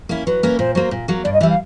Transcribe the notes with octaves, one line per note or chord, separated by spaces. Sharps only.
A#3 C#4 E4
F#3 B4
A#3 C#4 E4
A#2 C5
F#3 A#3 C5
A#2
F#3 A#3
G2 D5
D#5
E3 G3 E5
F5